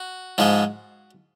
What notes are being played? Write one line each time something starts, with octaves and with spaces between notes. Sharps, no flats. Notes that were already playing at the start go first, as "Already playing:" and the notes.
Already playing: F#4
G#2 F3 G#3